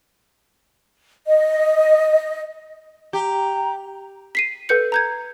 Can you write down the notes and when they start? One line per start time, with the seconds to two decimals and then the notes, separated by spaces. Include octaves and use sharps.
1.27 D#5
3.13 G4 A#5
4.35 B6 C7 D#7
4.69 A4 B4 G6 C#7
4.92 A#5 G6 G#6